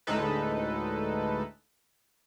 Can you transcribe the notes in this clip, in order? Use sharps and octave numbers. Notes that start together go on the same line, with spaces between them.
D2 A2 G#3 D#4 A4 B4